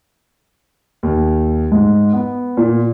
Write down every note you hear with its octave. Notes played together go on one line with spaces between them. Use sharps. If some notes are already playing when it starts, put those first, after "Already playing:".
D#2
G#2
B3
A#2